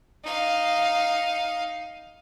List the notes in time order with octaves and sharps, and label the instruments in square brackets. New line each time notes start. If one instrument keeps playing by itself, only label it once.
[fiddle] D#4 F5